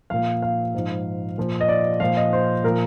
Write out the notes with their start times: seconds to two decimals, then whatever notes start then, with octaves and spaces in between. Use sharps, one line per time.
0.10 A#2 F3 F5
0.42 F5
0.74 G#2 F3
1.38 A#2 F3
1.61 D#5
1.69 D5
2.00 A#2 F3 F5
2.17 D#5
2.33 C5
2.64 A#2 F3 A#4